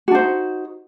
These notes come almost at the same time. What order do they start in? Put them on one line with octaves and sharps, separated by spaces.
F#4 D4 C5 D#4